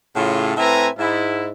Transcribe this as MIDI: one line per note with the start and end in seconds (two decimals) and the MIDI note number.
0.15 0.52 45
0.15 0.52 49
0.15 0.52 65
0.56 0.88 45
0.56 0.88 60
0.56 0.88 71
0.56 0.88 76
0.56 0.88 80
0.56 0.88 82
0.98 1.49 44
0.98 1.49 64